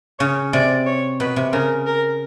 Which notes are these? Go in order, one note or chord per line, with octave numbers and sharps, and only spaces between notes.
C#3 C#5
C3 D5
C#5
B2 B4
C3
C#3 A#4
A#4